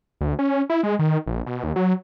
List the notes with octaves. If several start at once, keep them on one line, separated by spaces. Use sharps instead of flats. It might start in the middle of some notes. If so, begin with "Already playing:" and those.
D2
C#4
E4
G#3
D#3
A#1
B2
D#2
F#3